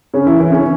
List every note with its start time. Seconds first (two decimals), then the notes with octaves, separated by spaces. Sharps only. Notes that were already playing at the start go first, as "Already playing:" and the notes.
0.14 C#3 C#4
0.26 E3 E4
0.40 E3 E4
0.52 C#3 C#4